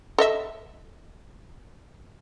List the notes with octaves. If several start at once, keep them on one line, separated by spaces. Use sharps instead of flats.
A4 D#5 E5